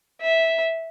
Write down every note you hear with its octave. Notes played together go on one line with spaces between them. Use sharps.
E5